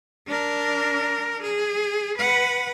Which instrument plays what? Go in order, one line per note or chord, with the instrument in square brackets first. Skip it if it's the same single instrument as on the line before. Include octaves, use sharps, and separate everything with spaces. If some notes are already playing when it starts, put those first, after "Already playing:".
[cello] D4 A#4
G#4
B4 F#5